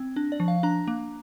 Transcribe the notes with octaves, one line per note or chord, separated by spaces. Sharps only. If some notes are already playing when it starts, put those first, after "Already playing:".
Already playing: C4
D4
D5
F3
F5
D4 A#5
A#3